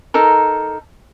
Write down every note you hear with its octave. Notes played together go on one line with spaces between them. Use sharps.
D#4 A4 A#4